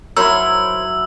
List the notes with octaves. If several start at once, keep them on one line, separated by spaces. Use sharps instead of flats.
F#3 E4 A#4 C5 E5 E6